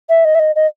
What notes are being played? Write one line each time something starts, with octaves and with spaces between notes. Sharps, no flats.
E5
D#5
E5
D#5
D#5